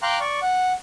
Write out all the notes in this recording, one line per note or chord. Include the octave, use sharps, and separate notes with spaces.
F5 G5 A#5 C6 D6 F#6
D5 C#6
F#5